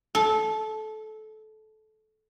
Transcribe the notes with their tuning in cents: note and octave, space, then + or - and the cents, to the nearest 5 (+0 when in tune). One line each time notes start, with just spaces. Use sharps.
A4 -20